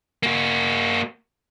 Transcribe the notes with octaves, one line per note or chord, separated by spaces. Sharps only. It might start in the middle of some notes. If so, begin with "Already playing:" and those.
A#3 F#4